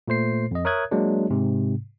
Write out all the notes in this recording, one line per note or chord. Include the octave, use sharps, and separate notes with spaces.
A#2 A3 C5 C7
F2 D#5
A#4 C#5 E5 D#6 F#6 G#6
F#3 G#3 A#3 D4
G#2 C3